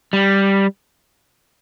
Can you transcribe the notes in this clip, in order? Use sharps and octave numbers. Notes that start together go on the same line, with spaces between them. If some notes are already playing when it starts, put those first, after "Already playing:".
G3